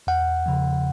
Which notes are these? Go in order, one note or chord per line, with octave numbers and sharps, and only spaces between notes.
E2 F#5
C#3 F3